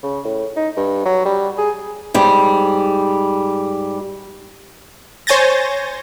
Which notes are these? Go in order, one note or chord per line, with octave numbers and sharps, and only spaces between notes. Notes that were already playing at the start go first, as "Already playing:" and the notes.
C#3
A2
D#4
G2
F#3
G3
G#4
G#2 G3
C5 C#5 G#5 G6 A6 A#6